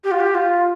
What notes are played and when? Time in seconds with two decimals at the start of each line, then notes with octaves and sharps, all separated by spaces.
0.04 G4
0.11 F4
0.20 G4
0.35 F4